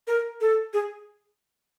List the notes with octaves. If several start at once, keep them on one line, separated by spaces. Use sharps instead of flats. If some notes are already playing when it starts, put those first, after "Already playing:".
A#4
A4
G#4